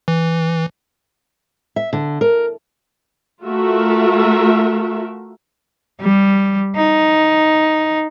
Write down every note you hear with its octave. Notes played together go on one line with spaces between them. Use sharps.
E3
E5
D3
A#4
A3 F4 F#4 A#4 E5
G3
D#4